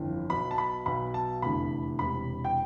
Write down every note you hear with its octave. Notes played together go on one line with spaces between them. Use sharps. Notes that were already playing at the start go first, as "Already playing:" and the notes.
Already playing: G1 F2 E3
B1 B2 B5
A5
B5
B1 B2 B5
A5
F1 E2 D3 B5
E1 E2 C3 B5
G5